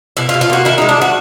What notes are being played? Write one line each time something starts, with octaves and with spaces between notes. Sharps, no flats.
B2 E4
F4
B2
F4
A#3 F#4
D#3 E4
D#4
G#3
D4
D#3 F#4